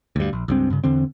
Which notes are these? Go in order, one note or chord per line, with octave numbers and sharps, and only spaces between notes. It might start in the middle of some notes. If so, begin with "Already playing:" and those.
D2 G2
A#1
C#2 G2 C4
G2 C#3
E2 D3 C4